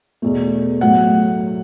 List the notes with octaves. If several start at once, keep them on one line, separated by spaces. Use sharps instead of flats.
E2 B2 A3
A2 F#3 A3 F#5